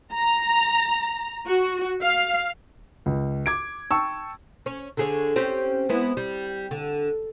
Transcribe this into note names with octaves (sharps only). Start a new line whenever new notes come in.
A#5
F#4
F5
C#2
D6 G#6 D7
G5 A5 C#6 E6
C#4 C#5
D3 G#4 C#5
C4 C#4 G4
G#3 B3 E4
G3
D3